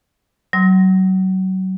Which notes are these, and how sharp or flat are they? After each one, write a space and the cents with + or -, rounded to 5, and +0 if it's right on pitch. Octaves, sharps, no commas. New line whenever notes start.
F#3 +30 C6 +0 E6 -45